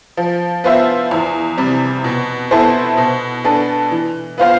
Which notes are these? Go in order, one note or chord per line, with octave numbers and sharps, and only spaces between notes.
F3
B3 F4 C5 E5
E2
C3 G3
B2
B3 E4 A4 C5
B2
B3 D4 A4
E3
B3 F4 C5 F5